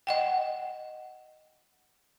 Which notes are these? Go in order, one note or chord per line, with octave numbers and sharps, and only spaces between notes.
D#5 F#5 G5